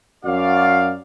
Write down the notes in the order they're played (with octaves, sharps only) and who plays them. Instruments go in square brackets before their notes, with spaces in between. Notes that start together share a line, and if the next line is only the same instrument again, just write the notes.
[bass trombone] F#2 [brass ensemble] F#4 D5 F5